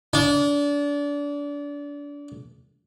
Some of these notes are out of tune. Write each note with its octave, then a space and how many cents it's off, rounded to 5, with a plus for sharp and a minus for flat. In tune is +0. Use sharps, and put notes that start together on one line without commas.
D4 -30